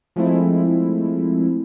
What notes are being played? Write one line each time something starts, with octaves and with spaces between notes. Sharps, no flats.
F3 G#3 A3 C4 E4